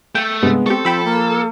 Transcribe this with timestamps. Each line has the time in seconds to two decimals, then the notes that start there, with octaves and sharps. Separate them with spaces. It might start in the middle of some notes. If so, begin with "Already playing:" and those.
0.15 A3 G5
0.43 G2 C3 G#3 B3
0.66 C4 G4 A4 C#6
0.85 F3 G5 B5 E6
1.04 A#3